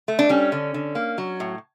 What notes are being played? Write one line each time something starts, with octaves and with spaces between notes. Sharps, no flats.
A3
D4
G3 C#4
D3
D3
A#3
F#3
A2